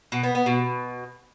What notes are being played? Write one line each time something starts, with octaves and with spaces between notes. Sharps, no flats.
B2
B3
B3
B2